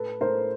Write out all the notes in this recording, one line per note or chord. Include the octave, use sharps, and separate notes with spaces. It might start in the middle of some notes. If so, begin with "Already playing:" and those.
Already playing: A2 A4 B4
A2 A#4 C5